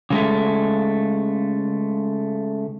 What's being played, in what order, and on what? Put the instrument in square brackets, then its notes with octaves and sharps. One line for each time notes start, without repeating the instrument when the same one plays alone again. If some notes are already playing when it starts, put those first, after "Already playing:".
[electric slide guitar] C#3 G#3 A3